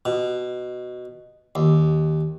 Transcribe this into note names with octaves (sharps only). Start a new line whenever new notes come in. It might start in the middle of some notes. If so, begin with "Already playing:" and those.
B2
D#2